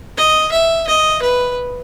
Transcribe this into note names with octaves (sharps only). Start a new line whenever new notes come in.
D#5
E5
D#5
B4